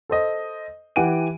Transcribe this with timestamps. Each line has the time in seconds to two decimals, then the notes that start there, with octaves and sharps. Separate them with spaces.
0.10 A4 C5 D#5
0.96 E3 G4 F#5 G#5 D7 D#7